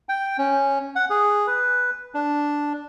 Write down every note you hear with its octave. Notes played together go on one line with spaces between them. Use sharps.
G5
C#4
F#5
G#4
B4
D4